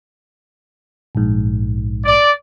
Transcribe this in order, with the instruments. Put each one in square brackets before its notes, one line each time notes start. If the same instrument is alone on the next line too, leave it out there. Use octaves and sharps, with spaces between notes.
[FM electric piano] A#1 G#2
[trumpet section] D5